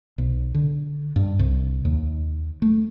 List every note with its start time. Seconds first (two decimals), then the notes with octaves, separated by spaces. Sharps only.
0.18 B1
0.54 D3
1.16 G2
1.39 C2
1.85 D#2
2.62 A3